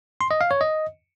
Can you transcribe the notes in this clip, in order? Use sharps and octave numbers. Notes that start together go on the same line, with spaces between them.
C6
D#5
F5
C#5
D#5